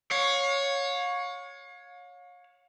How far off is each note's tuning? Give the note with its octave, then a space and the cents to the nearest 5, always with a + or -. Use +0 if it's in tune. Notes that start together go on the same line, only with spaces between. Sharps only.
C#5 +0 F5 +40